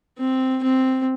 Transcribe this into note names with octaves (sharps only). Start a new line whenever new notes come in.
C4
C4